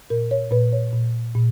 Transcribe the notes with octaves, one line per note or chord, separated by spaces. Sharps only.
A#2 A#4
C#5
A#2 B4
C#5
A#2
A#2